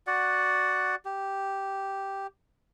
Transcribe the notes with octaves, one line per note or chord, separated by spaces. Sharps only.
F#4 D5 F#5
G4